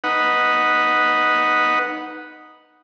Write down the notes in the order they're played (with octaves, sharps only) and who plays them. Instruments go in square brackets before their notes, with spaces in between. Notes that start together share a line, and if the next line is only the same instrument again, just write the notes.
[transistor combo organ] D#4 B4 F#5